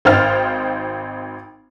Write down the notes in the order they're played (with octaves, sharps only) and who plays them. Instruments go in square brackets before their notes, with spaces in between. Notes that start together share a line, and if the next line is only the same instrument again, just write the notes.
[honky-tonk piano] G#1 D#4 C5 G5 F6 A6